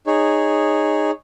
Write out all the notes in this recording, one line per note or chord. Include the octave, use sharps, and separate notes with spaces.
D#4 G#4 C#5